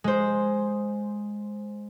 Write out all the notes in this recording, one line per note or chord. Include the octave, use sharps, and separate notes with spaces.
G#3 C5